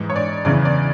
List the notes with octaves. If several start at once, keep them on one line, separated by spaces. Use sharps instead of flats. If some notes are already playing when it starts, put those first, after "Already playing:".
Already playing: G#2 E3
C#5
D5
E2 C#3 E3 D5
D5